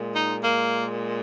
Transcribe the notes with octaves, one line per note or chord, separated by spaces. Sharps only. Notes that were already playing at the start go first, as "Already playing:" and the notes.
Already playing: A#2 G#3
D#4
A#3